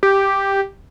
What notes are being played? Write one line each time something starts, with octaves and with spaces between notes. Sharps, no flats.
G4